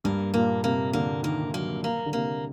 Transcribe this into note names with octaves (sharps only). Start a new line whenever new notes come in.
G2 A#3
A#2 A#3
C3 A#3
D3 A#3
D#3 A#3
D#3
F#3 A#3
A#3
D3
C3 A#3